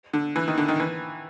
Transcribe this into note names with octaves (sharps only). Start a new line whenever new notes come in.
D3
E3
D#3
D3
D#3
E3